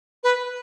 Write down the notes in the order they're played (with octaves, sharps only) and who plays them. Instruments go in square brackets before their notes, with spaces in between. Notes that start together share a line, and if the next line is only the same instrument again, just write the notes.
[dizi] B4